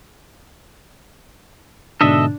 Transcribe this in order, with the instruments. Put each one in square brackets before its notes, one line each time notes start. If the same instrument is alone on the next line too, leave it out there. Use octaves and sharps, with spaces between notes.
[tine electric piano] G#2 B2 D3 [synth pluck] D4 [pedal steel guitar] A4 D#5 E5